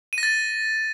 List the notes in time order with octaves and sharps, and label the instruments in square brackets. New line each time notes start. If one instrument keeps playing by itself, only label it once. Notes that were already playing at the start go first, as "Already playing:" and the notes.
[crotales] D#7
A#6
A6